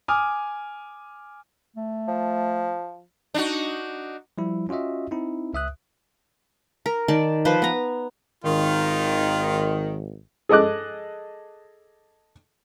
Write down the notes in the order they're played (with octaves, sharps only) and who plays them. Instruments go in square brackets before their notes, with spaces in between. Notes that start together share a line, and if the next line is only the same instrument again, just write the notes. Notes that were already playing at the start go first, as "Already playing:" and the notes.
[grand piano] G#5 D6 D#6 F6
[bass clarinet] A3
[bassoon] F3
[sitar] D4 D#4 F#4
[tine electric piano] F3 G3 E4
C#4 F4 F#4 D#5 E5
C4 D#4 E4
C#2 E5 D#6 F#6
[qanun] A#4
D#3 D5 A5
F3 B4 C5
B3 A#5
[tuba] G#1 [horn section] D#3 [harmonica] F4
[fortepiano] G#4 A4 D#5 D6 F#6